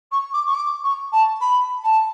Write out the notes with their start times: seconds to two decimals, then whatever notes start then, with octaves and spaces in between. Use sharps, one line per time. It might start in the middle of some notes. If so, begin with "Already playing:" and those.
0.12 C#6
0.33 D6
0.46 C#6
0.55 D6
0.83 C#6
1.12 A5
1.40 B5
1.83 A5